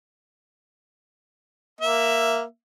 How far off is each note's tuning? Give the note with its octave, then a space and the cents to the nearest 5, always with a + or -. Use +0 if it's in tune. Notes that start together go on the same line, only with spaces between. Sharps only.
A#3 +0 E5 +10